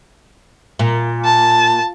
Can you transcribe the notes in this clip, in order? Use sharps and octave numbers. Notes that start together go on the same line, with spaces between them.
A#2
A5